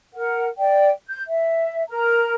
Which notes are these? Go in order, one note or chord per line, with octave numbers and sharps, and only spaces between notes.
A#4 F#5
D5 G5
G6
E5
A#4 A#5